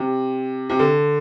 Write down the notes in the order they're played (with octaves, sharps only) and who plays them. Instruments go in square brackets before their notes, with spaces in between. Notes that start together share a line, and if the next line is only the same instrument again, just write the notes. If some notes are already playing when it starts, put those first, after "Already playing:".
Already playing: [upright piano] C3
C3
D3